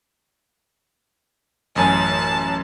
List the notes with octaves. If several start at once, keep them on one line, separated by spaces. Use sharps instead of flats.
A1 F#2 G#5 A5